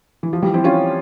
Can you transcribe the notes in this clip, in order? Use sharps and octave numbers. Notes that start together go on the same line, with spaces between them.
E3
F3
E3 G3
C4 E4
C#4 F4